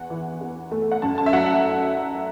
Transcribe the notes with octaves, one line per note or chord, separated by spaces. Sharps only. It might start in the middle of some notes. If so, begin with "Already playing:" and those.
Already playing: E2 F#5
E3
E2
A3
F#5
F#2 A5
A5
E5
F#3 F#5